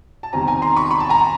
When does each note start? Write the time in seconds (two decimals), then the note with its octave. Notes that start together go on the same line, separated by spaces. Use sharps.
0.23 A5
0.33 E2 C3 D#3 G3 C4 G#5 A#5
0.47 G#5 A#5
0.62 A#5 C6
0.76 B5 C#6
0.91 B5 C#6
1.00 A5
1.09 G#5 A#5